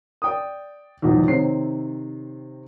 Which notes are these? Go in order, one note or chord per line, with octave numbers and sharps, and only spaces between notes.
D5 G5 D#6
E2 G#2 B2 D#3 F3 F#3
C3 D#3 C4 C#5 C7